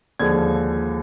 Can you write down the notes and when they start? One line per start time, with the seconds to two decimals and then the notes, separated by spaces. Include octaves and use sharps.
0.19 D#2 D3 F3 G#3 G#6